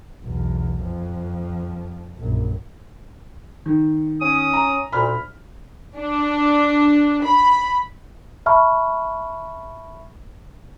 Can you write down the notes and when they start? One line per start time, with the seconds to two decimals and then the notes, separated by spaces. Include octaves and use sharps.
0.22 B1 E2
0.82 F2 F3
2.16 A#1 F#2
3.66 D#3
4.21 C#4 D#6
4.53 A#5
4.92 D2 A#2 B5 F6
5.97 D4
7.23 B5
8.46 E5 A5 B5 C#6 F6